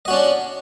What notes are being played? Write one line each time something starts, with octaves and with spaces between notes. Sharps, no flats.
C#4 D4 F#4 D#5